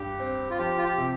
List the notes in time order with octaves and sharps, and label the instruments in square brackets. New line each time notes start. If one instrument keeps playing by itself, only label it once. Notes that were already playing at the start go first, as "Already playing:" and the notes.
Already playing: [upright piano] G2 [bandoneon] G4
[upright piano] C4
[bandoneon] F4
[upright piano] F3 [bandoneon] G4
[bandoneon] F4
G4
[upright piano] C3